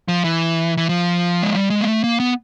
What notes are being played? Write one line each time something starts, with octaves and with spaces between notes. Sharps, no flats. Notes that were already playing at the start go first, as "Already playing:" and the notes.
F3
E3
E3
F3
G#3
G3
G#3
A#3
A3
A#3
B3